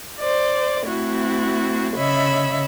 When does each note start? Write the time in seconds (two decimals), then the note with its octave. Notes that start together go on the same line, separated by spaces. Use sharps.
0.20 C5 D5
0.84 A3 C4 E4 F#4
1.95 C#3 C#5 D#5 E5 B5